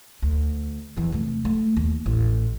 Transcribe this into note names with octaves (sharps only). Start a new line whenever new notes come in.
D2
E2 E3
C3 A3
A3
D#2
A1